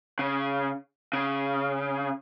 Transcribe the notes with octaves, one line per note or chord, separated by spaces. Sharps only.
C#3
C#3